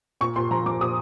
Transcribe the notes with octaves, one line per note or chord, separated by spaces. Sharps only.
A#2 C#6
A#2 C6
F3 A#5
F3 D6
A#2 D#6